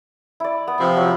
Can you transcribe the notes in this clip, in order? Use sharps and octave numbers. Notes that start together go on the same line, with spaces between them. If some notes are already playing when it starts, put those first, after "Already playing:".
E4 D5
B3
C3 F3 C4
F#3